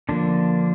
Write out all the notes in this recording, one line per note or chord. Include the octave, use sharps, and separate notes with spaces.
D3 F3 A#3 D4